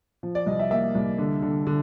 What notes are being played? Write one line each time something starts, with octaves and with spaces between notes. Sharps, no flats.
F3
D5
C2 D#5
E5
A#3 E5
C2
D3
D3
D3